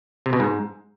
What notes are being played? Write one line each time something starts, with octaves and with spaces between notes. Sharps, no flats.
C3
B2
G#2